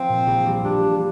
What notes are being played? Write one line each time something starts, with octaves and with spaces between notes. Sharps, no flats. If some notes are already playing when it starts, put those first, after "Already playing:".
Already playing: F3 C4
A#2
A#1
G3
A#1 D4
G3